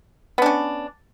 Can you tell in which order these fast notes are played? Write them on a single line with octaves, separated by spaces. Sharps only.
B3 D4 C#4